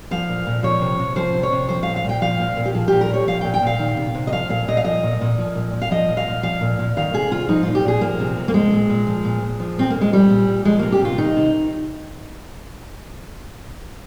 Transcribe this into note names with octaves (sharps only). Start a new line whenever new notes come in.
F3 F5
A#2
A#2
F3 C#5
C3
C3
F3 C5
C3
C#5
C3
F3 C5
F5
A#2
F5
A#2 G5
F3 F5
A#2
A#2
G4
F3 G#4
A#2 G4
A#4
A#2 C#5
F3 F5
A#2 G5
G5
A#2 F5
D#3
C3
C3
D#5
F3 F5
A#2 F5
A#2 D#5
F5
F3 D#5
A#2
A#2
F3
A#2
A#2
F5
F3 D#5
A#2
F5
A#2
F3 F5
A#2
A#2
D#3 F5
C3 G#4
C3 F4
F3 D#4
A#2 F4
G4
A#2 G#4
F3 A#3
C3
C3
A#3
F3 G#3
A#2
A#2
F3
A#2
A#2
F3
A#2 C4
A#3
A#2
G#3
F3 G3
A#2
A#2
F3 G#3
C3 A#3
G4
C3 F4
D#3 D#4
C3